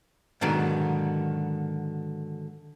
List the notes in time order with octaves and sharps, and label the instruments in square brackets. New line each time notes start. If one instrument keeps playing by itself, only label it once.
[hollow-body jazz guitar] G#2 B2 D3 D#3 F#3